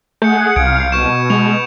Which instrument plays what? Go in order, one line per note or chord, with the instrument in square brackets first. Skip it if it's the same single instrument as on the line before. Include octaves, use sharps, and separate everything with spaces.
[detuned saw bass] A3 [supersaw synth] G#4 F#5 [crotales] G6 C#7
[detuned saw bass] C2 [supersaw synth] F5 [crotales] G#6 C#7 D7
[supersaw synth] B2 [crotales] C#6 G6 E7
[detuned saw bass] G#3 [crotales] F7